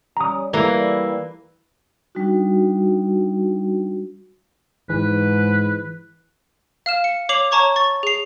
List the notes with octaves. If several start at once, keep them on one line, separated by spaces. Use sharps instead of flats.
G3 C#4 A#5 D#6
E3 G3 A3 A#3 E4
G3 D4 D#4 F#4
G#2 E3 B4
F5 F6 E7
C#7
C#5 D6 C7 F7 F#7
C#5 A5 A#5 C#6 G#6
C#6 A6
G#4 C7